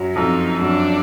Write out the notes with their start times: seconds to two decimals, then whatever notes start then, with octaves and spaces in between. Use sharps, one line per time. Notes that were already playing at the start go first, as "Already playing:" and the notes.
Already playing: F#2 F#3
0.15 F2 F3 D#4
0.61 F#2 F#3 D4